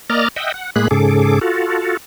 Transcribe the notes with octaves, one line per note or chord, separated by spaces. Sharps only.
A#3 D5 D#5 A#5 F6 A6
D#5 E5 F#5 G5
F#5
A2 G#3 A#3 G#4 B5 F#6
G#2 C#3 G#4 A4 D6
F4 F#4 A4